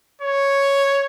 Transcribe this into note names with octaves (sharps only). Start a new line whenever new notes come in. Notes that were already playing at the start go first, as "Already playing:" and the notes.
C#5